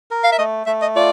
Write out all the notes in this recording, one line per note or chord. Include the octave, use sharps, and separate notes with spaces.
A#4
F5
E5
A3 D#5
A3 E5
D#5
F4 D5